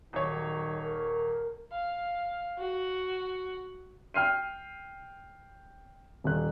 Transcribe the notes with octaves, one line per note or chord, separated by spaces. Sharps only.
D#1 D#3 F#3 C#5
A#4
F5
F#4
G5 F6 C7 D#7
D#1 F#6